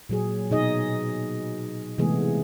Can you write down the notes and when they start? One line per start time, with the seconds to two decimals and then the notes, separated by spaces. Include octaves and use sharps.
0.09 A#2 F#3 G#4
0.51 B2 D#4 G#4 D#5
1.98 C3 E3 G#3 A3 B3 G#4